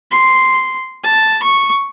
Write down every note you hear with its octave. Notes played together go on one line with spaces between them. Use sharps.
C6
A5
C#6